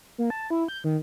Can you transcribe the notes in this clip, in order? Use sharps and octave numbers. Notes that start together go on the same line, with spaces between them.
A#3
A5
E4
G6
D#3